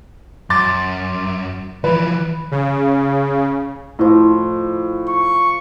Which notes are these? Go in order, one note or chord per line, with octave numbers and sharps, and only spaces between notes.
F#2 C6 D6 A6
E3 F3 B4
C#3
A2 F3 D#5
C#6